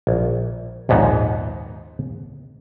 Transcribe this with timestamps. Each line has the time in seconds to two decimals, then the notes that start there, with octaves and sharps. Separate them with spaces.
0.07 A#1
0.89 A#1 D#2 G#2 B3 D#4